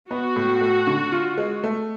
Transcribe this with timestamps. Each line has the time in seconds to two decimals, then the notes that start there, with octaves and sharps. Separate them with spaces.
0.11 B3 F#4
0.36 A2
0.61 A3
0.87 D3
1.12 F4
1.38 G#3
1.64 A3